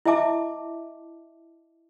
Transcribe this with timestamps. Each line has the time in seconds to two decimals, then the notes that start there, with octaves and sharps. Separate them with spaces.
0.05 E4 D#5 E5 A5 D6